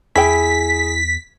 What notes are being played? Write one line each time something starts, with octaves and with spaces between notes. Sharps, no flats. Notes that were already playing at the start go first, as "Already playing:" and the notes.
E2 E4 G#4 G5 B6